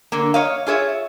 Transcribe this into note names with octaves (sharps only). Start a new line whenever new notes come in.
D3 A#3
C#5 D#5 F5
F4 G#4 C#5 E5